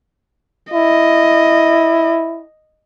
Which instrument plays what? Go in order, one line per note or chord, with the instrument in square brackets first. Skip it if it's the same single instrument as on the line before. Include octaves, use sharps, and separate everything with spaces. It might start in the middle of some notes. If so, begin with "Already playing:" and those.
[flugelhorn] E4 [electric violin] D#5